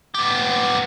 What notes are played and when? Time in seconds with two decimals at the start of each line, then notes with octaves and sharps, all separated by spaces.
0.15 B3 G4